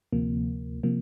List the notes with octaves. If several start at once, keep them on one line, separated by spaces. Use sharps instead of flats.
D2 C3 F3 A#3
C3 F3 A#3